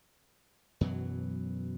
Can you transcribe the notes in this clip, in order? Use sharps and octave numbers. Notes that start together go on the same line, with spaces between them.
F#2 B2 E3 F#3